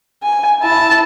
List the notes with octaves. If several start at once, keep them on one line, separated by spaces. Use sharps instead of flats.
G#5
E4 A5